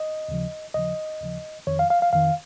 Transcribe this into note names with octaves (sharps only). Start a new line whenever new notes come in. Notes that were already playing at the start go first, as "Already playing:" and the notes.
Already playing: D#5
D#2 C#3 F3
D#2 C#3 F3 D#5
D#2 C#3 F3
F2 D#3 C#5
F5
F5
F5
F2 D#3 F5